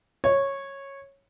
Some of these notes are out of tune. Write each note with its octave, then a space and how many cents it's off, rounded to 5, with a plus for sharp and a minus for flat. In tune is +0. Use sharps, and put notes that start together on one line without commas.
C#5 -10